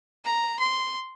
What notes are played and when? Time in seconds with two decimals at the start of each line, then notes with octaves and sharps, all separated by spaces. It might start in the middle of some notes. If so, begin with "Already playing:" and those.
0.25 A#5
0.60 C6